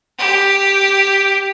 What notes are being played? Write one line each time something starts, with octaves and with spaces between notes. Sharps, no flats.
G4